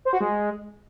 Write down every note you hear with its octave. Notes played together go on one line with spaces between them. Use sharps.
C5
F#4
G#3